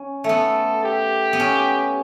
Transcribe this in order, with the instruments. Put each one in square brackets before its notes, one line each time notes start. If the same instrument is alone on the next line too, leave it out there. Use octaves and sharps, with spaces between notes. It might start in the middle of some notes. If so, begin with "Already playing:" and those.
Already playing: [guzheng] C#4
A3
[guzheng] B3 [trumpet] A4
[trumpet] G4
[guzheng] B3
C#4